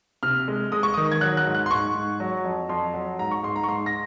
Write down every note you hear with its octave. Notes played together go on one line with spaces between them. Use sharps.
C3 F6
G#3
G#3 D#6
C#6
D#3 D#6
G#6
F#3 F#6
F#6
G#2
F#6
C6
G#2 C#6
G#2
F#3
F2
F2 C6
F#3
G#2 A#5
C#6
G#2 C6
A#5
C#6
G#2 C6
A#6